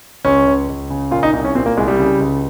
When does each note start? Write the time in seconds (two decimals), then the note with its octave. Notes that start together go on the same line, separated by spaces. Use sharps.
0.25 C#2 C#4
0.47 C#2
0.69 C#2
0.90 C#3
1.11 A#2 F4
1.23 D#4
1.33 C2 D#4
1.44 C#4
1.55 A#2 C4
1.66 A#3
1.77 C2 G#3
1.88 G3
1.99 C#3
2.20 C#2